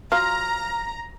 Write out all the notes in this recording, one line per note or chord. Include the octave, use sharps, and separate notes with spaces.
F#3 F4 A#5 F6